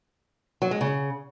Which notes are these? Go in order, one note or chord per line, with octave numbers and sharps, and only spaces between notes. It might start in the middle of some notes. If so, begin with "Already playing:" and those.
F#3
G#3
C#3